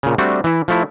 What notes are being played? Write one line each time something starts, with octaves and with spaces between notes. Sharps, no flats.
A#2 C#3
G3 A3 C4 D4 F#4
E3 E4
F3 A3 E4